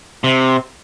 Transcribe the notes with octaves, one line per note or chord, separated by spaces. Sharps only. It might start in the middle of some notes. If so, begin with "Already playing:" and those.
C3